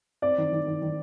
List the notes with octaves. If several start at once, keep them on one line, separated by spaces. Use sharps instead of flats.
C4 D5
D#3
D#3
D#3
D#3